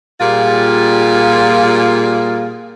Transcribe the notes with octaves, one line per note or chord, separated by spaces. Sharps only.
A#2 G3 A#3 F4 G4 G#4